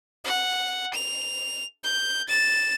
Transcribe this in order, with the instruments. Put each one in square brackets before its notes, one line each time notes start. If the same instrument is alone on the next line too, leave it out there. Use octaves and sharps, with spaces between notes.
[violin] F#5
F7
G6
A6 E7